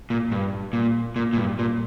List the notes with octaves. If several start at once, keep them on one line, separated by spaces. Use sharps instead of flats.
A#2
G2
A#2
A#2
A#2
G2
A#2